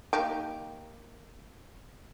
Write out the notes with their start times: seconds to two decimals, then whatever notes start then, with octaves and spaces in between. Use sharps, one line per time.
0.13 A#3 D#4 G4